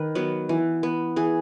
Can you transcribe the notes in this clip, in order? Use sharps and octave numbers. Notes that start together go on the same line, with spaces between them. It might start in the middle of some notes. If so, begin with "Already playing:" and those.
Already playing: D#3 B4
F#3 B3
E3
B3
E3 G#4